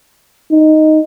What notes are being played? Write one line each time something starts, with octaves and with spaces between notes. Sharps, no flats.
D#4